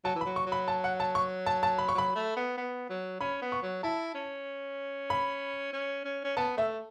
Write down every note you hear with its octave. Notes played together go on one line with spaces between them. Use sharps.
F#3 A5
E3
B5
F#3
C#6
F#3
B5
A5
F#5
A5
C#6
A5
A5
B5
C#6
F#3 B5
A3
B3
B3
F#3
C#4 B5
B3
C#6
F#3
E4 A5
C#4
B5
C#4
C#4
C#4
B3 A5
A3 E5